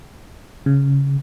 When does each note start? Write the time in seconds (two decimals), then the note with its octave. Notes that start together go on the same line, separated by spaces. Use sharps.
0.66 C#3